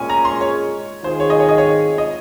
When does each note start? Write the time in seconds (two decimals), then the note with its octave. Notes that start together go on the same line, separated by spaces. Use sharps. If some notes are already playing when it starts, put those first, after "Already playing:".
Already playing: A#2 G#3 C#4 G#5
0.10 A#5
0.25 C6
0.41 C#5
1.04 D#3 G#3 C4 F4 G#4 C5
1.20 C#5
1.30 D#5
1.40 C#5
1.49 D#5
1.58 C#5
1.98 D#5